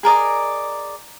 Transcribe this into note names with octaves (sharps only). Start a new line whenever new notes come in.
G#4 A#4 D5 D#5